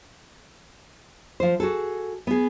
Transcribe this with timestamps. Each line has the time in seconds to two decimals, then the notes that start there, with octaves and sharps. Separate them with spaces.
1.40 F3 C5
1.60 F#4 G#4 A4
2.27 B3 G#4